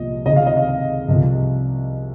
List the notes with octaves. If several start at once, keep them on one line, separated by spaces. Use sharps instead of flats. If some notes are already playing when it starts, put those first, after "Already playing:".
Already playing: C2 A#2 F3 D#5
C#2 C3 D#3 D#5
F5
D#5
F5
C2 C3 F3